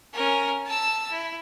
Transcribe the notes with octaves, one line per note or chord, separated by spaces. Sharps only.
C#4 A#4
A5 E6
E4